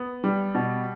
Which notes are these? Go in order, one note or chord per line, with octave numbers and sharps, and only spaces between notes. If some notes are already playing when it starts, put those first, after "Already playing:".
Already playing: B3
G3
B2